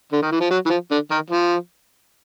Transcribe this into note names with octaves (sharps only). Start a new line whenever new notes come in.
D3
D#3
E3
F3
F#3
E3
F3
D3
D#3
F3